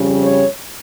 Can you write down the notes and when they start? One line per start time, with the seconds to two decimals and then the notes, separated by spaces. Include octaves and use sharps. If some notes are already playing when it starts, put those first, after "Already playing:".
Already playing: F2 C#3 G3 C#4
0.22 C#5